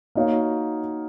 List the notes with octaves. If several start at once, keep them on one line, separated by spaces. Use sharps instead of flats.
A#3 D#4 F#4 C#5 F5